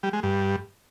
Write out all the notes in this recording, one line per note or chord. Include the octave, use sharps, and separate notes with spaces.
G3
G#3
G2